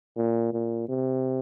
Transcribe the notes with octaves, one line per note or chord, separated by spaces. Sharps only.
A#2
A#2
C3